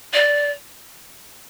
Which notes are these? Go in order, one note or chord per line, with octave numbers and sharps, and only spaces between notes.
D5